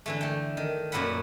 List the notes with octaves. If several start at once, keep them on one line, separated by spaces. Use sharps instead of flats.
D3 E3 A3
A3 G5
D#3
F#2 A#2 B4 E5 F#5 B5